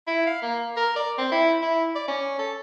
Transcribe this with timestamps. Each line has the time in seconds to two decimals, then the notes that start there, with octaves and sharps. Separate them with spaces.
0.07 E4
0.26 F5
0.42 A#3
0.76 A#4
0.96 D5
1.18 C4
1.32 E4
1.62 E4
1.95 D5
2.08 C#4
2.39 A4